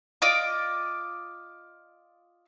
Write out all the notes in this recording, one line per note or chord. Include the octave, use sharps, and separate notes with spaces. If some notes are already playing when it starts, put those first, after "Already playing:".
F4 D5 D#5 D6